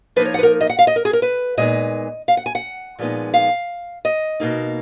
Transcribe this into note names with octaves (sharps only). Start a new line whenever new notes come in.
F3 A#3 D#4 B4
C#5
F#5
B4
A#4
D#5
F#5
F5
D#5
A#4
G#4
A#4
B4
A#2 G#3 B3 D#4 D#5
F5
F#5
G#5
F#5
A#2 F3 G#3 B3 D#4
F5
D#5
B2 A#3 D#4